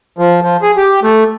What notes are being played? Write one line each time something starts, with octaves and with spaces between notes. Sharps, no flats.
F3
F3
G#4
G4
A3